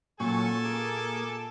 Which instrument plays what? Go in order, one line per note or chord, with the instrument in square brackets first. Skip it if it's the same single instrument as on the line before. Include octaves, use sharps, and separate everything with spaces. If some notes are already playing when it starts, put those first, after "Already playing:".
[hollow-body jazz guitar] A#2 [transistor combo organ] F#3 C#4 C#6 [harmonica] A4 G#5 A5
[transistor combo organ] A#3 G#4 D6